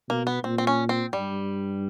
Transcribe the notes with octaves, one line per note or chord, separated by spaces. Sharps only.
B2 A#3
B3
A#2 C4
C4
C#4
C4
G2 G3